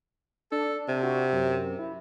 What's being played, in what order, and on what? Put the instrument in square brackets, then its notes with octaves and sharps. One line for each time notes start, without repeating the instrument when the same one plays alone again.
[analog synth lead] D4 [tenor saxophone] A4
[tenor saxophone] C3
[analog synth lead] F#4
F#2
E4